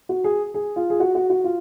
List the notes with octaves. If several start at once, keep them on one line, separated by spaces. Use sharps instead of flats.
F#4
G#4
G#4
F4
G#4
F#4
F#4
F#4
F4